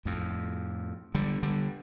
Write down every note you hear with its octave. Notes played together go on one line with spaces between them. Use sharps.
F2 A2
D3 G3
D3 G3